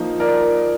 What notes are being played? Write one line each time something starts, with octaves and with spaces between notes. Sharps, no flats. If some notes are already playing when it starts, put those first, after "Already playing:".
Already playing: F3 A#3 D#4
A#4 D5